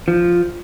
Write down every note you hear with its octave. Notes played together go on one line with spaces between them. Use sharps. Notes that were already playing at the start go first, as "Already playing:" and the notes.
F3